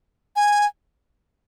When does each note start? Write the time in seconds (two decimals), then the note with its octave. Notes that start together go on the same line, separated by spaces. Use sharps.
0.36 G#5